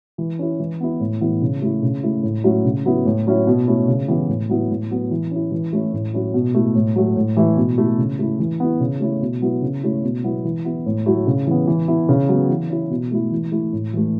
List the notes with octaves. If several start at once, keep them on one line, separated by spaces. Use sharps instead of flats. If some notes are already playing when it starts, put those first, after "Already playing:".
E3
C#4 E4
E3
B3 E4
A2
E3 B3 E4
C#3
A3 E4
C#3
A3 E4
A2
F#3 A3 C#4 E4
C#3
F#3 B3 E4
A2
F#3 C#4 E4
B2
A3 C#4 E4
C#3
E3 B3 E4
A2
F#3 B3 E4
A2
F#3 B3
E3
C#4 E4
E3
A3 C#4 E4
A2
F#3 C#4 E4
B2
A3 E4
A2
F#3 A3
A2
E3 A3 E4
B2
A3 E4
C#3
A3 E4
E3
B3 E4
C#3
A3 C#4 E4
B2
F#3 B3 E4
C#3
A3 C#4 E4
B2
F#3 B3 E4
E3
B3 E4
A2
F#3 A3 E4
C#3
E3 B3
E3
B3 E4
C#3
F#3 B3
E3
C#4 E4
B2
A3 E4
E3
A3 E4
A2
E3 A3